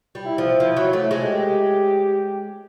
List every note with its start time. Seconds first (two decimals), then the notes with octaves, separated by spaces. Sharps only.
0.15 G3
0.26 E4
0.38 F3
0.60 F3
0.77 F#3
0.93 A3
1.11 G#3
1.27 G4